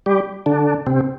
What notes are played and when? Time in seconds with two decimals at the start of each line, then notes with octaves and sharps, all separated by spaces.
0.06 G3 G4
0.46 D3 D4
0.87 C3 C4